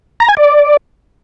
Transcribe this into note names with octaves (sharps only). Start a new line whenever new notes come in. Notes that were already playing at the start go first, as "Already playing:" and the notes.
A#5
G#5
D5